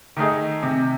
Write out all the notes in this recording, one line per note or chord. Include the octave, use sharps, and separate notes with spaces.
D#3 A3 D#4 G#4
C3